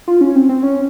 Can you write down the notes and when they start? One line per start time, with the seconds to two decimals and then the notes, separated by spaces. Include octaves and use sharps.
0.08 F4
0.21 C#4
0.36 C4
0.49 C4
0.63 C#4